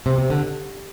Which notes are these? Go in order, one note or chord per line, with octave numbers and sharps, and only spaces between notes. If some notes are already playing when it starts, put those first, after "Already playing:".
C3
C3
D3